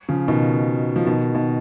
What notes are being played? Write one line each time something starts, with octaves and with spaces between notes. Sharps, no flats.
C#3 F3
B2 D#3
F3
B2 D#3
B2 D#3